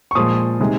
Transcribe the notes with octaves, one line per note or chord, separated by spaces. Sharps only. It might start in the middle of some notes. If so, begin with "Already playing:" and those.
C#6
A#2 F3 G#3 C6 D#6
C3 D#3 G#3